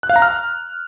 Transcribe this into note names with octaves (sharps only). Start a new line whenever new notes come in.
F#6
F5
A#5
F6